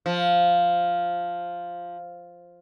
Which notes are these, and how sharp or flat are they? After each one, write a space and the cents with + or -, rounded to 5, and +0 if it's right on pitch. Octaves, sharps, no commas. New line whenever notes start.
F3 +0